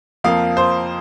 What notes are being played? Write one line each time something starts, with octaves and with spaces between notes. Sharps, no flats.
F2 F3 A#3 F5
C5